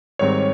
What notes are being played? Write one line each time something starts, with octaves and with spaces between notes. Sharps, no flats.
G#2 D#3 G3 C4 C#5